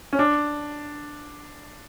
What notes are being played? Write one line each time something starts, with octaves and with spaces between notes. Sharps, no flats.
C#4
D4